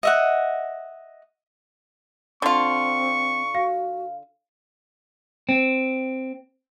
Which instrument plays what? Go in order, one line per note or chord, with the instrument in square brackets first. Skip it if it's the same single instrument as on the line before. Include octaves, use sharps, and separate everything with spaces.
[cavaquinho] D#5 E5 F#5
[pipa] D3 F4 [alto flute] C4 [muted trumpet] C#6
[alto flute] F#4 [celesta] F5
[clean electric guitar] C4